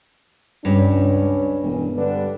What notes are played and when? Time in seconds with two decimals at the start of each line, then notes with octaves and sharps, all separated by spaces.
0.65 C#2 G2 C#4 D4
1.63 E1
1.97 D3 G3 D4 B4